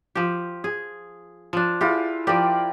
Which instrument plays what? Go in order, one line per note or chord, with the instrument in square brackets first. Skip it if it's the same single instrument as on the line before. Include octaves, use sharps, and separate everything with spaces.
[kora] F3 G4
G#4
F3 D4
[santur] E4 F4 G#4 [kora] G4
[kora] F3 G4 [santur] A#4 D5 G5